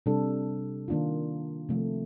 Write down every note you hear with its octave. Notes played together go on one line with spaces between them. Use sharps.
C3 G3 D4 A4
D#3 A#3 D4 F4
C3 F3 A3